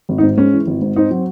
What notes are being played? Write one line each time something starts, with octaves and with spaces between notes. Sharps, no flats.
G#1
D#4
G#2
G#3 C#4
E3
G#1
G#2
C4 D#4
F#3